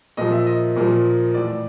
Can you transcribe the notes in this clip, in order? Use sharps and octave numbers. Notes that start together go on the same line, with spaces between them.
A#2 F3 D#5
E5
D#5
A#2 F3
A2 E3 D5
D5